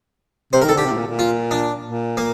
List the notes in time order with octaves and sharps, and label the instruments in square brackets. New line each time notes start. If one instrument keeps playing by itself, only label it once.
[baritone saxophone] C3 [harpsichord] C5
[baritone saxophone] D#3 [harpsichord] A#4
[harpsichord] A4
[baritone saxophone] D3 [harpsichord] G4
[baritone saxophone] C3
A2
A#2
A#2
[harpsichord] F4
D4
[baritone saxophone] A#2
[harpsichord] A#3